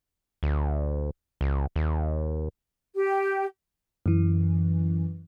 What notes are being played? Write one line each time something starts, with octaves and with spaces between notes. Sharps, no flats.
D2
C#2
D#2
G4
F#2 E3